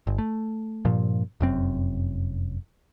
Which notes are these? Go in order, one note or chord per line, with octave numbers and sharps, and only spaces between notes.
G1
A3
G2 A#2 F3
F1 F#2 C4